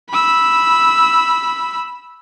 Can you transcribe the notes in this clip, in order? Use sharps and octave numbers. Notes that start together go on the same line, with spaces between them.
B5 E6